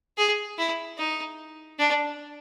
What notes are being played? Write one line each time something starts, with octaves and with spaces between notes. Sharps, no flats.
G#4
E4
D#4
D4